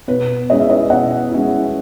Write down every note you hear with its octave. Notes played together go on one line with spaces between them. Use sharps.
B2 B4
G#3 C#4 E4 D#5
E5
B4 D#5
B2 D#5 F#5
G#3 C#4 E4